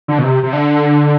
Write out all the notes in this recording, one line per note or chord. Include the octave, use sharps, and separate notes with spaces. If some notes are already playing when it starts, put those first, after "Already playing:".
D3
B2
C3
C3
D3